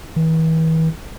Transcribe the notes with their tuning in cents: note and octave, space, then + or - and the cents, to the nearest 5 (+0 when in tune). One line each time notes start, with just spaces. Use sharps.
E3 -40